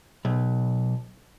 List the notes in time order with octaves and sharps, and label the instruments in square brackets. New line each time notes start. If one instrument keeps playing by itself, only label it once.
[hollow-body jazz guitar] B1